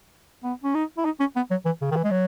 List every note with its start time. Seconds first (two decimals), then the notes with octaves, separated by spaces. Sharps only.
0.44 B3
0.64 C#4
0.75 D#4
0.98 E4
1.05 D#4
1.20 C#4
1.36 B3
1.51 F#3
1.66 E3
1.82 C#3
1.91 D#3
1.96 E3
2.04 G#3
2.11 F#3